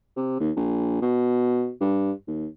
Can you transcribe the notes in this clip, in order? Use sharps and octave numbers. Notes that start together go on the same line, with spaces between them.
C3
D#2
A#1
B2
G2
D#2